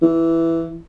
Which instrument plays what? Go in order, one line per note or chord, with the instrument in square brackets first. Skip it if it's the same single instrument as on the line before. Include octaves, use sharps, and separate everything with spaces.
[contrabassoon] E3